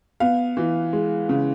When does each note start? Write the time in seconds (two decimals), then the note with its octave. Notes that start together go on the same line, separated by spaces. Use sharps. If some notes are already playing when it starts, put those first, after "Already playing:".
0.20 B3 F5
0.57 E3
0.93 G#3
1.29 C#3